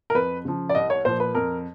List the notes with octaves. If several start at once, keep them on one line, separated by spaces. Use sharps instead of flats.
A#4
F2 B4
C#3 F3
D5
C2 D#5
C#5
A#2 F3 C5
B4
F2 A#4